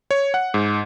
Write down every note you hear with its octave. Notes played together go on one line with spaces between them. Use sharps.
C#5
F#5
G#2